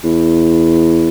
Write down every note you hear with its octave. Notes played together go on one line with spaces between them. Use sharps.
E2